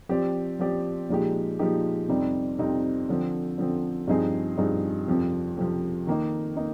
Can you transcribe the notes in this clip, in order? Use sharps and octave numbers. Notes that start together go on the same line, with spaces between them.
F3 C4 G4 D5
F3 C4 G4 D5
A#2 F3 G#3 D#4 G4
A#2 F3 G#3 D#4 G4
F2 C3 G3 C4 D#4
F2 C3 G3 C4 D#4
D3 F3 C4
D3 F3 C4
G2 F3 C4 D#4 G#4
G2 F3 C4 D#4 G#4
F2 C3 F3
F2 C3 F3
D#3 A#3 D#4
A#3 D#4